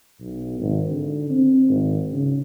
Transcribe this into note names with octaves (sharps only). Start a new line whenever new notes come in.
B1
G#1
D3
C4
G#1
C#3